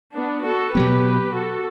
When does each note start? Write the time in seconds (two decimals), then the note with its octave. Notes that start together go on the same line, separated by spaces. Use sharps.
0.15 B3 D4
0.45 F#4 A4
0.75 B2 F#3 B3 G4 B4
1.34 F#4 A4